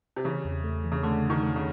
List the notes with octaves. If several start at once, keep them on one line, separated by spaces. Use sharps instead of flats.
C3
C#3 E3
E2
A3
E3
C#3
D3 A3
C#3
D#3
A3
C#3